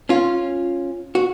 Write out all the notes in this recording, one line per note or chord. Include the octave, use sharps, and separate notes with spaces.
C#4 F4
F#4